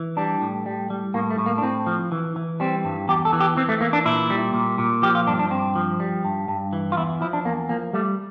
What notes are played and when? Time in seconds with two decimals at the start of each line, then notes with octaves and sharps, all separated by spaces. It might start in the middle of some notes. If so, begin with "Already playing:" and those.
Already playing: E3
0.17 G3 D4
0.41 A2
0.66 G3
0.90 G3
1.14 A2 A#3
1.31 A3
1.38 A2
1.46 A#3
1.58 D4
1.63 A2 C4
1.86 F3
2.12 E3
2.36 E3
2.60 G3 C4
2.85 G2
3.08 E2 G4
3.25 A4
3.33 E3
3.40 G4
3.57 E3 C4
3.69 A3
3.81 E3 A#3
3.93 D4
4.05 A#2 E4
4.30 G3
4.54 A#2
4.78 A#2
5.02 F3 G4
5.15 F4
5.27 G2 D4
5.39 D4
5.50 G2 C4
5.76 F3
6.00 G3
6.25 G2
6.48 G2
6.73 E3
6.92 F4
6.97 E2 E4
7.21 F3 E4
7.33 D4
7.45 E2 A#3
7.69 F3 A#3
7.93 G3 A3